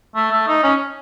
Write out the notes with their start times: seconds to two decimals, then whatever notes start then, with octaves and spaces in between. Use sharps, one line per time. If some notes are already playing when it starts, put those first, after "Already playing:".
0.16 A3
0.32 A3
0.48 D#4
0.63 C#4